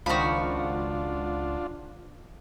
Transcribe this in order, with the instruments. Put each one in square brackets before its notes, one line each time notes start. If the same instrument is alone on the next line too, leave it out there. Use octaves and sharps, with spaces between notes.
[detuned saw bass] C#2 [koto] D#3 F3 [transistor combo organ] D4 F4 [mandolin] F#4 B5